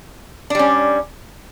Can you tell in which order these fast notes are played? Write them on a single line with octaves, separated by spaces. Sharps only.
D4 G3 C#4